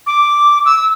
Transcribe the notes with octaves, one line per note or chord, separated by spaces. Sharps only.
D6
E6